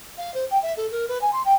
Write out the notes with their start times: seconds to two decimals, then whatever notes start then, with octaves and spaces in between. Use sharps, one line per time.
0.18 F5
0.34 C5
0.51 G5
0.62 E5
0.77 A4
0.91 A#4
1.08 B4
1.21 G#5
1.33 C6
1.45 G5